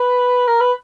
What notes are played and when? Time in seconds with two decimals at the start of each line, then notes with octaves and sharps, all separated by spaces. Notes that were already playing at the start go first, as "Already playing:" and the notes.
Already playing: B4
0.47 A#4
0.60 B4